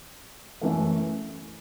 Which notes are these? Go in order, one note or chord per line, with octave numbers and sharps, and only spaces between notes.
F#2 E3 A3